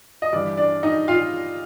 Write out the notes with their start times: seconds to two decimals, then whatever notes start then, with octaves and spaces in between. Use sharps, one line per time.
0.22 D#5
0.33 G2 E3 D4 D5
0.57 D4 D5
0.83 D#4 D#5
1.08 F4 F5